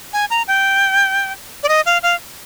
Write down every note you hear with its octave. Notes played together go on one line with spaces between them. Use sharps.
G#5
A#5
G5
D5
D#5
F5
F5